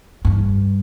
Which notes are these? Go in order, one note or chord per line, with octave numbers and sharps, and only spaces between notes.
G2